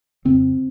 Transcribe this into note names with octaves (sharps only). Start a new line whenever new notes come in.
F2 C#3 C4